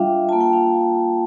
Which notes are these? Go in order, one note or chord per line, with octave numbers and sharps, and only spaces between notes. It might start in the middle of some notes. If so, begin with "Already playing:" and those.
Already playing: G3 D4 F4 E5 F5 G5
A#3 F4 A5
G5
F5